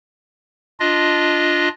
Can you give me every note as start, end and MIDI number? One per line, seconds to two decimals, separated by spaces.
0.80 1.69 62
0.80 1.69 65
0.80 1.69 75